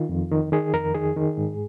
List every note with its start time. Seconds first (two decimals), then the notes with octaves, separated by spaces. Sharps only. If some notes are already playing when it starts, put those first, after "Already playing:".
Already playing: D#3 F4
0.09 F2
0.32 D#3
0.52 D#3 G#4
0.73 F2 A#4
0.95 D#3 G#4
1.16 D#3
1.38 G#2